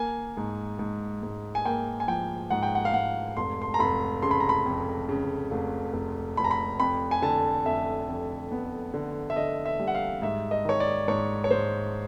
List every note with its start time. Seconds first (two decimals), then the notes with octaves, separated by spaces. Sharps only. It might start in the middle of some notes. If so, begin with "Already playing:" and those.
Already playing: A#3 G#5
0.37 G#2
0.79 G#2
1.23 G#2
1.55 G#5
1.65 A#3 G5
2.00 G#5
2.08 F3 G5
2.50 G#2 F#5
2.63 G5
2.75 F#5
2.85 F5
2.94 G#2 F#5
3.37 F1 C6
3.62 C6
3.74 A#5
3.79 F1 B5
4.22 C#3 C6
4.31 B5
4.40 A#5
4.49 B5
4.66 F2
5.09 C#3
5.51 F1
5.93 F1
6.37 F1 B5
6.44 A#5
6.51 B5
6.80 F2 B5
7.11 G#5
7.22 D3 A5
7.65 F2 E5
8.09 F2
8.52 B3
8.94 D3
9.30 E5
9.36 D3 D#5
9.66 E5
9.80 G3
9.87 F#5
9.95 F5
10.22 G#2 E5
10.51 D#5
10.65 D#3 C#5
10.80 D5
11.08 G#2 C#5
11.44 C#5
11.51 G#2 C5